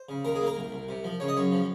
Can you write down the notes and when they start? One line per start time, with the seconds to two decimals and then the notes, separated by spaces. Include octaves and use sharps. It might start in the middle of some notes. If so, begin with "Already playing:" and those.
Already playing: C5
0.09 C#3
0.25 D#2 A#4
0.35 G#4
0.41 A#3
0.47 A#4
0.57 C2
0.72 C2
0.89 C3
1.04 F3
1.20 C#3 C#5
1.28 D#5
1.37 F#2 C#5
1.52 F3